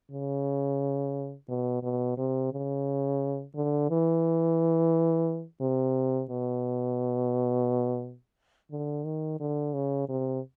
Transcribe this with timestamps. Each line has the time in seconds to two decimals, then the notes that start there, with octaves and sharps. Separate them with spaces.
0.11 C#3
1.49 B2
1.83 B2
2.17 C3
2.52 C#3
3.55 D3
3.90 E3
5.61 C3
6.30 B2
8.71 D3
9.05 D#3
9.40 D3
9.74 C#3
10.09 C3